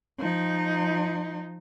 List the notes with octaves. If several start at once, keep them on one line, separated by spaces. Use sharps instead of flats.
F3 D#4